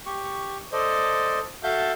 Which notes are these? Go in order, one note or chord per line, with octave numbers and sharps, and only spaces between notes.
G4 C#6
A4 C5 D5 D#5
F#4 A4 E5 F5 A5 G6